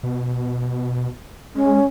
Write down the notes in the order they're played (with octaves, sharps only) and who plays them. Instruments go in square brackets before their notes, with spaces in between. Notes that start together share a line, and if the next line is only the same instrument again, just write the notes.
[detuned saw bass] B2
[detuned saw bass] G#3 [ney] C#4